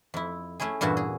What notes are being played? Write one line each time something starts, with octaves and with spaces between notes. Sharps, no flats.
F2 E4
A3 C#4 E4 G#4
E2 G2 A#2 E4 F#4 A5
G#4